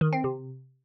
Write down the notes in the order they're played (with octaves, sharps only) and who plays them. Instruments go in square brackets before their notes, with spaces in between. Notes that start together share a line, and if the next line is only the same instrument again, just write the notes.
[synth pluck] D#3
C4
C3